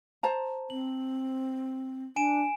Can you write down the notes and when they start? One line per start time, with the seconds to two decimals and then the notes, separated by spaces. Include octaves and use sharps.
0.23 C5 A5 A#5
0.70 C4 F#7
2.16 D4 G#5 D7 E7